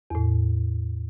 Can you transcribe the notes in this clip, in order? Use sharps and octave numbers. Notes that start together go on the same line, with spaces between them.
E2 A2